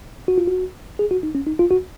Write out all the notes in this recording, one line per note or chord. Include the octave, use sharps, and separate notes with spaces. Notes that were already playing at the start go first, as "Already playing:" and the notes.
F#4
F4
F#4
G#4
F#4
D#4
C#4
D#4
F4
F#4